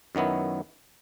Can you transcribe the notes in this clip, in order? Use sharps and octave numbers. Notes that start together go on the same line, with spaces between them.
F#2 D#3 F#3 B3 E4